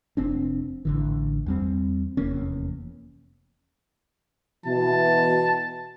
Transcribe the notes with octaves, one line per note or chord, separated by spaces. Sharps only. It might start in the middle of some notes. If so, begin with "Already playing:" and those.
F1 C4 D4
A1 D3 E3
E2 G3 C4
F1 E2 A#3 C#4
B2 E3 A5